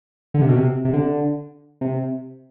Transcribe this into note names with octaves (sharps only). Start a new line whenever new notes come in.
D3
C3
B2
C3
C3
D3
C3